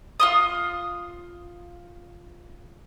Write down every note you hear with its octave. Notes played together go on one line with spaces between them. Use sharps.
F4 C6 D#6